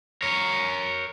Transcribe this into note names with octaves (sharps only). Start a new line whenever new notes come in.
A#4 C#5